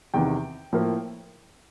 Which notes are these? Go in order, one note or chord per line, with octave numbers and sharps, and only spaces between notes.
E2 C3 D#3 G5
A2 F3 A#3